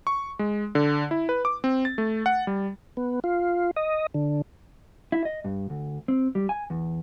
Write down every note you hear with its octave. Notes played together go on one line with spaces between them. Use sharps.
C#6
G#3
D3
E4
B4
D6
C4
A6
A3
F#5
G3
B3
F4
D#5
D3
E4
D#5
G2
D2
C4
G3
G#5
E2